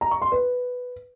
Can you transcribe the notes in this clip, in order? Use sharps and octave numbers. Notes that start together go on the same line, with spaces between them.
A#5
C#6
C6
B4